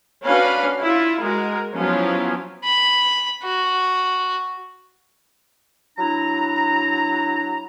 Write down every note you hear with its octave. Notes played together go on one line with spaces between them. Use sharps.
C#4 D4 F#4 B4 F5
E4 F4
G#3 F#4 A#4
F3 F#3 B3 C#4 E4 F4
B5
F#4
F#3 D4 E4 A#5